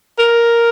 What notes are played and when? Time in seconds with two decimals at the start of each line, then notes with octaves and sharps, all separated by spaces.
0.19 A#4